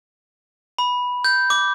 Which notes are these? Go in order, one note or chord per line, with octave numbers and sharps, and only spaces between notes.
B5
G6
D6